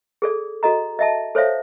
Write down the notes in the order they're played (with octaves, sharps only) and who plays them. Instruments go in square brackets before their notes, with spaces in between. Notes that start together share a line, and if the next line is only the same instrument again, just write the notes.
[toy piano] G#4 A4 D5
F#4 A4 D#5 A#5
D#5 E5 A5
A4 C5 C#5 E5 F5